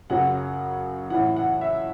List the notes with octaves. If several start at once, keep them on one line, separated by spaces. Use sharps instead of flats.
F#2 C#3 F#3 F#5
A2 E3 F#5
F#5
E5